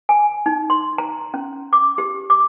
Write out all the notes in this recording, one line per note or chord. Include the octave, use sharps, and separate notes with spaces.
G#5
D#4
C6
A#5
C#4
D6
G4
D6